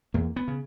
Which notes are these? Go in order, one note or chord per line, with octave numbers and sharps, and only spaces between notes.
E2 A#3
B3
C#3